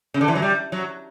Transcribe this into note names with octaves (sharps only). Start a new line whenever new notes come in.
C#3
D3
E3
F#3
G3
F#3